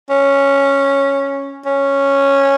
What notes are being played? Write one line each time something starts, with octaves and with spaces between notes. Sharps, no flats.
C#4
C#4